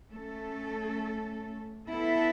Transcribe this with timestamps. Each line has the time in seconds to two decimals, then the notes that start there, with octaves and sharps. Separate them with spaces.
0.13 A3 C#4 A4
1.89 B3 E4 A4 E5